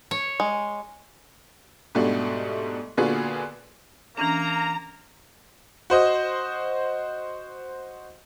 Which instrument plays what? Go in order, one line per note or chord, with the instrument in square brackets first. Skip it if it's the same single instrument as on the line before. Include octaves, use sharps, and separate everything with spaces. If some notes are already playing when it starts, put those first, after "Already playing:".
[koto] C#5
[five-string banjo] G#3
[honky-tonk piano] G#2 B2 G3 A3 D4 F#4
A#2 D3 B3 F4 F#4 G#4
[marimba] E3 C#4 D4 [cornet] A#3 [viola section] A#5
[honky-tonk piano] F#4 C5 D#5